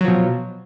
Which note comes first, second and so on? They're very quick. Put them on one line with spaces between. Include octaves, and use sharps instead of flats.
F#3 F3 B2